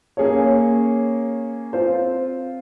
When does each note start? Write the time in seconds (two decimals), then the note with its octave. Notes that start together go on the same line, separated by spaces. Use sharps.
0.17 A#3 C#4 G#4 C#5
1.73 C4 F4 C5